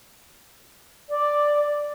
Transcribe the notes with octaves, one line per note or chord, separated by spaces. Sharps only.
D5